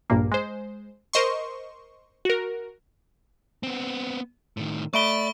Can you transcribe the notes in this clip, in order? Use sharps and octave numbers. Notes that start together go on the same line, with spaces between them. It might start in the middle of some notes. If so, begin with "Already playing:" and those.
A#1 G2 A#2 A#3
G#3 C5
A#4 C5 D#5 C6 C#6
F#4 A#4
B3 C4
A2 D#3
A3 D5 E5 B5 C#6 D7 G7